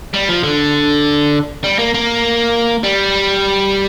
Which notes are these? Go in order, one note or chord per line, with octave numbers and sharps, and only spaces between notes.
G3
F3
D3
G3
A#3
A#3
G3